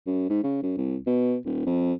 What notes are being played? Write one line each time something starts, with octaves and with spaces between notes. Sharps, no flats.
F#2
G#2
C#3
F#2
C2
B2
D#1
F2